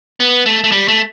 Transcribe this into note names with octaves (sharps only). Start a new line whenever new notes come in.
B3
A3
A3
G3
A3